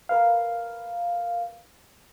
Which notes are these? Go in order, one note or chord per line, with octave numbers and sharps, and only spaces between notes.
A#4 B4 F5